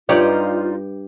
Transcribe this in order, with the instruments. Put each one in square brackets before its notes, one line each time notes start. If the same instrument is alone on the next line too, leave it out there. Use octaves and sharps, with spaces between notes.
[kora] G2 G4 [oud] D#4 C#5 D5 [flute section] F4